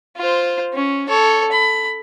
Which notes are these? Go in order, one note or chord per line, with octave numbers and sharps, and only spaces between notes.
F4 C5
C#4
A4 C#5
B5